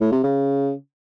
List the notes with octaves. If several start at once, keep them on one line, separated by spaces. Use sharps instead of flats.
A2
C3
C#3